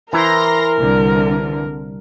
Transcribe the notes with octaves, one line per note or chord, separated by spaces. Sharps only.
E3 E4 A#4 C5 A#5 C6 A#6
C2 D3